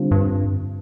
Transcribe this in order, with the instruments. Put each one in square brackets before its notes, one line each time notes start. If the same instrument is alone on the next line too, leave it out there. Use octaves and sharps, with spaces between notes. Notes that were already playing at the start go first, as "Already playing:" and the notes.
Already playing: [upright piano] D3 G3 C4 F4
[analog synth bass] G2